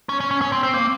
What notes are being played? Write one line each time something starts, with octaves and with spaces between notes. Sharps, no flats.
C#4
C#4
C#4
C#4
C4
C4
A#3